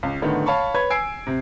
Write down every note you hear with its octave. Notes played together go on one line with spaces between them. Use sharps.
C#2
A2 D3 D#3 B3
C#5 F5 A5 B5 C#6
B4 C#5 B5 G#6
G#5 E6 G#6 C7 D7
C3